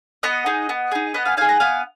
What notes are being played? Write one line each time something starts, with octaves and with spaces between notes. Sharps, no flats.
B3 D#5 F#5
D#4 G#4
B3
D#4 G#4
B3 D#5 F#5
F5 G#5
D#4 G#4 F5 G#5
F#5 A#5
B3 F5 G#5